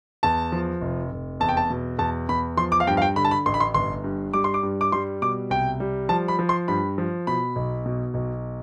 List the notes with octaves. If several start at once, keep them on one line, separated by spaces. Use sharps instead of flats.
E2 A5
F3
F1
F1
E2 A5
G5
A5
B2
E2 A5
E2 B5
F3 C6
D6
F5
G2 G5
F5
G5
D3 B5
A5
B5
A1 C6
B5
C6
G1 C6
G2
G3 D6
C6
D6
G2
D6
G3 C6
B2 D6
C2 G5
G3
F3 A5
B5
F3
C6
G2 B5
F3
B2 B5
B1
B2
B1